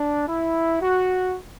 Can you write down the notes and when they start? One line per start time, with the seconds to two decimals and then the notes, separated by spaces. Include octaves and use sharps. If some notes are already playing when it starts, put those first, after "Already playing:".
Already playing: D4
0.29 E4
0.82 F#4